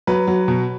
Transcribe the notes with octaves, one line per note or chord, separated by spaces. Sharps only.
F#3 B4
F#3
B2